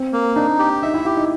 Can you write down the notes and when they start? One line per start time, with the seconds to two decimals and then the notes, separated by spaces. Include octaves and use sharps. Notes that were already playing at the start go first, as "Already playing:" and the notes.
Already playing: C4
0.13 A#3
0.35 D4 D#4
0.59 G4
0.82 D#4 E5
0.94 E4
1.05 E4 G4
1.17 D#4